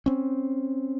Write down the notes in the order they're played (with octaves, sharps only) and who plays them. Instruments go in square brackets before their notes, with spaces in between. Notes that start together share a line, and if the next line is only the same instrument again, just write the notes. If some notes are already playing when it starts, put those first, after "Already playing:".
[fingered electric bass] C4 C#4